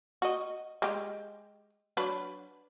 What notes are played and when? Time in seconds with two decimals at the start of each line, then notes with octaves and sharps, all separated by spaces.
0.22 F#4 D#5
0.82 G#3 G4
1.97 F#3 D4 B4